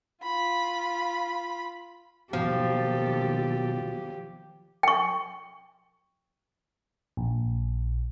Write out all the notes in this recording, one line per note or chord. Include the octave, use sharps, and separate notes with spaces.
F4 B5
D#2 B2 F3 F#3 G4 A4
G5 C#6
A#1